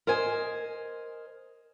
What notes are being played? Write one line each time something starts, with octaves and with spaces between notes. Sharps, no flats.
A#4 C5 D#5 G#5